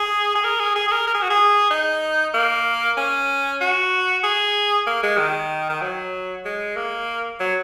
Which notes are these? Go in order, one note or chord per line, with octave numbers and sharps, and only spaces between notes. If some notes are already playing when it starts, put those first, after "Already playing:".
Already playing: G#4
G#4
A#4
G#4
G#4
G#4
A#4
A#4
G#4
F#4
G#4
D#4
A#3
C#4
F#4
G#4
A#3
G#3
D#3
D#3
F#3
G#3
A#3
F#3